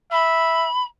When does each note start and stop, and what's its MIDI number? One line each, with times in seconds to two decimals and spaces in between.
0.12 0.67 76
0.12 0.84 83